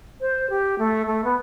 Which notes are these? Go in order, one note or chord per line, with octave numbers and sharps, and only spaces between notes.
C5
G4
A3
A3
B3